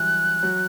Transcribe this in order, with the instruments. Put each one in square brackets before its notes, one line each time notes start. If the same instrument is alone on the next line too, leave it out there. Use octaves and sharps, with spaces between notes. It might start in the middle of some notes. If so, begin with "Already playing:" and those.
Already playing: [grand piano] E3 F#3 G3 [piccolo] F#6
[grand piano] F#3